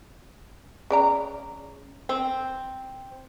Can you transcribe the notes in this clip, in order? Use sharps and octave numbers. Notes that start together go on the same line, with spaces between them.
C#3 D5 A#5
C4